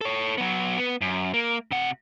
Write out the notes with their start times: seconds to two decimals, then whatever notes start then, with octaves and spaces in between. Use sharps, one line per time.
0.01 A4 C#5
0.38 F#3 B3
0.78 B3
1.01 F#2
1.34 A#3
1.71 C3 F#5